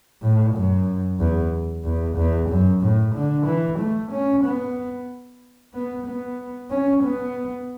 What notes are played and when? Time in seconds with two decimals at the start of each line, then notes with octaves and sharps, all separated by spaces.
0.23 A2
0.55 F#2
1.19 E2
1.85 E2
2.16 E2
2.50 F#2
2.82 A2
3.15 D3
3.46 E3
3.79 A3
4.12 C#4
4.44 B3
5.74 B3
6.06 B3
6.71 C#4
7.04 B3